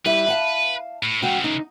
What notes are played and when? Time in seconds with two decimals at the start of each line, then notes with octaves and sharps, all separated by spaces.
0.06 G3 E4 B4 E5
0.28 F5 F#5 A5
1.03 A2
1.22 C#3 E3 G#3 F#4 G5
1.44 D#4